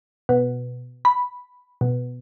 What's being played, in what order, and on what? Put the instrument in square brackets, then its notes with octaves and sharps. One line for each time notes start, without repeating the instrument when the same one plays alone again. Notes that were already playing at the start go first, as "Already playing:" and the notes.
[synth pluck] B2
B5
B2